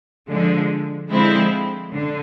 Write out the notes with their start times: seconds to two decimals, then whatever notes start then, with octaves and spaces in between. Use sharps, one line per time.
0.29 D3 F3 G#3
1.10 D3 F3 G#3 C4 E4
1.91 D3